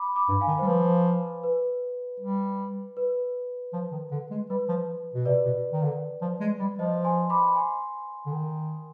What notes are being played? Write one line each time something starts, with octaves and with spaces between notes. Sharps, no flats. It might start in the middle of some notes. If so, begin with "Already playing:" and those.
Already playing: B5 D6
B5 D6
G2
F5 G#5
D#3
C5
G3
F3 B4
B4
G3
B4
F3
D#3
D3
G#3
G3 B4
F3
B2
C3 B4 D5
B2
D#3
D3
F3
G#3
G3
F3 C5 D#5
G#5 C6
B5 D6
G#5 C6
D3
D#3